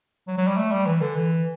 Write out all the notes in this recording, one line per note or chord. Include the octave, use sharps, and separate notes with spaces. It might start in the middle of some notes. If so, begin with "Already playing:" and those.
F#3
F#3
G3
A3
G3
E3
D3
E3